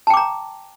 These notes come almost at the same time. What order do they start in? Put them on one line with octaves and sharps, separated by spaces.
A5 G5 D6 A#5